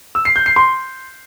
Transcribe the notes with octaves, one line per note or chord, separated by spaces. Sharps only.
E6
C7
G6
C7
C6